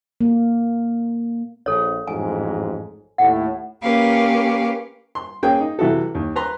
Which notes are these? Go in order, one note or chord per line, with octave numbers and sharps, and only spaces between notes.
A#3
A#1 A4 C#5
A1 F2 G#2 G#5
D#2 A2 F#5
A#3 C#4 G4 A#4 B4 F5
C6
A#3 C#4 G#4 G5
D#4
C3 E3 E4 F#4 A4
D#2
B4 A#5 C6